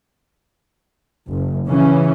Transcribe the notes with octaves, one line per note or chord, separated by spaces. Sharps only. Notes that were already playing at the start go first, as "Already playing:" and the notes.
F#1
C#3 E3 C#4